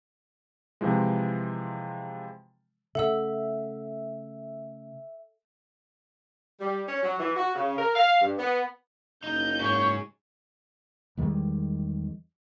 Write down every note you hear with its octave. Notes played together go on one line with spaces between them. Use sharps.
C3 E3 F3 G#3
C#3 A3 A4 E5 F#5 E6
G3
C#4
F#3
E3
F#4
C#3
A#4
F5
G2
B3
F#1 D#4 G6
G#2 G#4 C#5 C#6
E2 D#3 G3 G#3